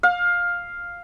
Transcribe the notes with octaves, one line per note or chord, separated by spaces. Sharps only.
F5